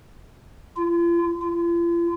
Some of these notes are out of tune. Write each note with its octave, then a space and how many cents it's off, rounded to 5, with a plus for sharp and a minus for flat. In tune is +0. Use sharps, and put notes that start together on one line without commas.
F4 -40
F4 -40